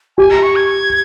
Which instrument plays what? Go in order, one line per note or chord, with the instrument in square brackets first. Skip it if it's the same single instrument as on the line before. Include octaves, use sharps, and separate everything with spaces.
[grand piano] G4 [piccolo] G#5
[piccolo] A#5
C#6
G#6